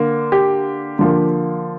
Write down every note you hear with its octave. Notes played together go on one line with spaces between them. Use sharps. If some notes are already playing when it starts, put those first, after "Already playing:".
Already playing: D3 A#3
G4
D3 F3 A#3